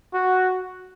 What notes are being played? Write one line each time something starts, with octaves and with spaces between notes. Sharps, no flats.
F#4